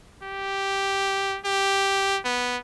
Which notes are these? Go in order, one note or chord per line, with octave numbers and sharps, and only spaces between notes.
G4
G4
B3